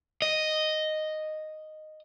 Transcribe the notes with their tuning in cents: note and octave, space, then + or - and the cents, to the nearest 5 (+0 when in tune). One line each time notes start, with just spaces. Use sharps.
D#5 -5